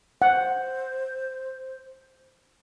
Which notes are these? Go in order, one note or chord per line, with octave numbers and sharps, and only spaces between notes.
C5 F#5